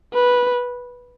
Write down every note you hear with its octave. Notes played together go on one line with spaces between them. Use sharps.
B4